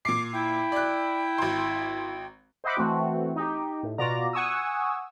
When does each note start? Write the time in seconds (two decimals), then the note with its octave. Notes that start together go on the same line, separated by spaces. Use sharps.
0.05 A#2 D6 C7
0.33 E4 G5
0.72 D5 F#6
1.38 G#1 C6
2.64 C5 D#5 E5 F#5 B5 D6
2.77 E3 A3 C4 F#4
3.35 D#4 G4
3.83 A2
3.98 B2 F4 F#4 D5 A#5
4.33 F#5 G#5 C#6 D#6 E6